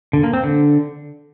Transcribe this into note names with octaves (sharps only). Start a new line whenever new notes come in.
D3
A#3
C4
D3